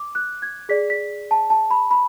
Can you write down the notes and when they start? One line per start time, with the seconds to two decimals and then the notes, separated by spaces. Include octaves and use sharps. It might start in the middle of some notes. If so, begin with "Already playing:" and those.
Already playing: D6
0.15 F#6
0.42 G#6
0.69 G#4 D5 B6
0.90 B6
1.31 A5
1.50 A5
1.71 B5
1.91 B5